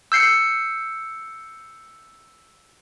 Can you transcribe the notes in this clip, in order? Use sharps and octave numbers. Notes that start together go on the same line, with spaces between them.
E6 G6 C7 C#7